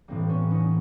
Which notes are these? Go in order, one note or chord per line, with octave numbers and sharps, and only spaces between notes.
A2 E3 G3 A#3 C4
B3 C#4
C#4 D#4